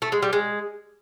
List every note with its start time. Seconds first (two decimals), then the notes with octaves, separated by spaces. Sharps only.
0.02 A3
0.12 G#3
0.22 G3
0.33 G#3